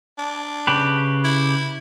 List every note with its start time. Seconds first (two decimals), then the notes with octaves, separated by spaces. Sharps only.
0.18 D4
0.67 C#3 G4 B4
1.24 E4